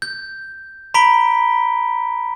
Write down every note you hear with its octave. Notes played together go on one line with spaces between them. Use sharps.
G6
A#5 B5 B6 D7 G7